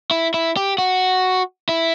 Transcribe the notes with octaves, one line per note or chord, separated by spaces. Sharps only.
E4
E4
G4
F#4
E4